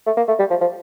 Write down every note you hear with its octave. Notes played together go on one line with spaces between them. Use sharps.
A3
A#3
A3
G3
F3
F3